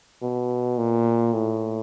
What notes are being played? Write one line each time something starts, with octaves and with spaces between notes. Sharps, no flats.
B2
A#2
A2